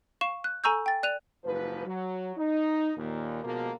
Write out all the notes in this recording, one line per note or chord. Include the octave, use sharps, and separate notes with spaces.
F5 C#6 E7
F#6
A4 G#5 A#5 C#6 E6 G6
G5 A6
D5 F#6 D#7 F7
F#1 G#2 F3 B4
F#3
D#4
D#2 A#2
B2 D3 F3 G#3 A#3